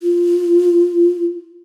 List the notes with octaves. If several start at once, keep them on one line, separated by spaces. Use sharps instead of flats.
F4